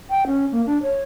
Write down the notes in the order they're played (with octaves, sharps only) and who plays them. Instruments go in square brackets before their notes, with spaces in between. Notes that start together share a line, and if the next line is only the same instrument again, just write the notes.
[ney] G5
C#4
A#3
D4
C#5